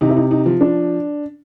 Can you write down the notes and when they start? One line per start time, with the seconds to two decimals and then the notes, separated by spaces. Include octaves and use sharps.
0.01 C3 D#4
0.09 E4
0.17 D#4
0.31 D#4
0.46 F3
0.61 D4